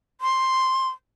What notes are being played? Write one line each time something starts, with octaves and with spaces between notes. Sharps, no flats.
C6